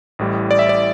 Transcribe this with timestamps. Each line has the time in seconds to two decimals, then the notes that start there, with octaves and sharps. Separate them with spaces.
0.19 A1 A2 G3
0.51 D5
0.59 E5
0.69 D5